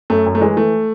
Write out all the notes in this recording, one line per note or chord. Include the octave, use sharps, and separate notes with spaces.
F#2 A3
F#2
A3
E3 G#3
E3 A3